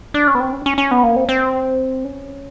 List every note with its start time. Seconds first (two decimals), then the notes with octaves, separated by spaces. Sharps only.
0.14 D4
0.28 C#4
0.35 B3
0.40 C4
0.53 C#4
0.66 C#4
0.78 C#4
0.91 B3
1.03 A#3
1.16 C4
1.29 C4
2.05 C#4